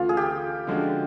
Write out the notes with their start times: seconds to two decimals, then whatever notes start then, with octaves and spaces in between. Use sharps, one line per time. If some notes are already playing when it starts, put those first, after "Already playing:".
Already playing: D2 C#3 E3 A3 F4
0.09 G#4
0.17 G4
0.67 D3 F3 G#3 C#4 F#4